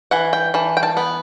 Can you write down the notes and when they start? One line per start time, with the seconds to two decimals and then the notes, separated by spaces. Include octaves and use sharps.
0.11 E3 F#5
0.33 G5
0.54 E3 A5
0.77 G5
0.83 A5
0.97 B3